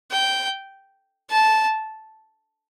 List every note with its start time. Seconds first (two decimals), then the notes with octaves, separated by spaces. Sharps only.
0.12 G5
1.30 A5